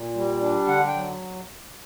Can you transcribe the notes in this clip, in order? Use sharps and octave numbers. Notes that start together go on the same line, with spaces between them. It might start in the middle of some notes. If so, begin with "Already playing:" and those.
Already playing: A#2
G3
D4
D3 F#5
G5
F#3